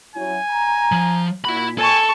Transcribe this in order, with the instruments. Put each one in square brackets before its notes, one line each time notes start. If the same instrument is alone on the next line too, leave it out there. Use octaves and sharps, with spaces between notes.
[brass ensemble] F#3 C#4 E4 [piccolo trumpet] G#5
[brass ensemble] A#5
[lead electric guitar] F3
[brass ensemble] A#2 [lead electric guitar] E4 B5 [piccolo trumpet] F#4
[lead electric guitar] A4 [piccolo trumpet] G#5 [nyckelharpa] A5 C#6